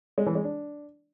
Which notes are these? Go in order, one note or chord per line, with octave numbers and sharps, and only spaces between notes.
G#3
E3
G#3
D4